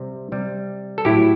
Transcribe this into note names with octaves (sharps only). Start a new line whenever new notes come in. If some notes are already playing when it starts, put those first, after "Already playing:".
Already playing: C3 G3
C3 G3
A4
A2 F#3 E4 G4